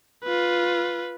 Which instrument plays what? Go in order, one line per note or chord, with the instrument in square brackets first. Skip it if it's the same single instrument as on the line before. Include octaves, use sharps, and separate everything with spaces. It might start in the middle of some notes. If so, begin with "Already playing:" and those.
[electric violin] F4 B4